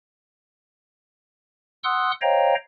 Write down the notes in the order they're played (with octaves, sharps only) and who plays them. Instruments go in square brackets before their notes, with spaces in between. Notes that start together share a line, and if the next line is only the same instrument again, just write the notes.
[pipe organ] F#5 C6 D#6 E6 F#6
C5 C#5 D#5 F5 G5 A#5